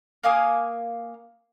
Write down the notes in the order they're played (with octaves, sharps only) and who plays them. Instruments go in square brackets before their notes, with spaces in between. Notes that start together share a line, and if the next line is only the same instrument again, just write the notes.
[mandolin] A#3 F5 G#5 D#6